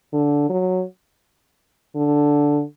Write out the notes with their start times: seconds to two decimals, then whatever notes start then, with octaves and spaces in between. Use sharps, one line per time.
0.13 D3
0.50 F#3
1.96 D3